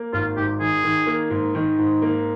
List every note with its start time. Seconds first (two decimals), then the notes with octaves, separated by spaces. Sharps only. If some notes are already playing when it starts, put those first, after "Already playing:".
Already playing: A#3
0.13 G#1 F4
0.37 G#2 G4
0.60 D#3 G#4
0.84 D#3
1.07 A#3
1.30 G#2
1.55 D#3
1.78 G#2
2.02 A#3